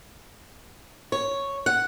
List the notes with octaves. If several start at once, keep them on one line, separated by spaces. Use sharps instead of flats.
C#5
F#5